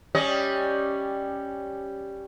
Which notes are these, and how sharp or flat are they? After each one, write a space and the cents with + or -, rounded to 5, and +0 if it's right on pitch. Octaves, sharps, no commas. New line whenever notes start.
G3 +0 C#4 +0 D#5 +10